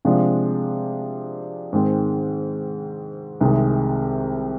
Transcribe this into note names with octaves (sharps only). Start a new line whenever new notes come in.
C3 F3 G#3 D4 F4
G#2 D#3 G#3 C4
C2 C3 D#3 G#3